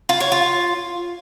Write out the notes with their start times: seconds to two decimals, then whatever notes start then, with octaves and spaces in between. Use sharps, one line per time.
0.09 F4
0.20 C#5
0.32 F4